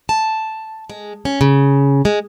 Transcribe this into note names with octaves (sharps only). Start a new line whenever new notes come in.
A5
G#3
C#4
C#3
G#3